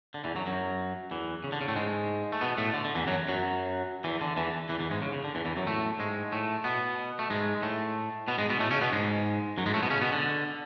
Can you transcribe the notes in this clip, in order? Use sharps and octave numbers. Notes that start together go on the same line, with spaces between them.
D3
E2 E3
F#2 F#3
F#2 F#3
E2 E3
C#3
D3
C#3
A2 A3
G#2 G#3
A3
B2 B3
A2 A3
D3
D3
E2 E3
F#2 F#3
F#2 F#3
E2 E3
D3
E2 E3
E2 E3
E2 E3
G#2 G#3
C#3
C#3
D3
E2 E3
E2 E3
F#2 F#3
A2 A3
G#2 G#3
A2 A3
B2 B3
A3
G#2 G#3
A2 A3
B2 B3
G#2 G#3
B2 B3
A2 A3
C#3 C#4
B2 B3
G#2 G#3
F#2 F#3
G#2 G#3
A2 A3
B2 B3
C#3 C#4
B2 B3
D3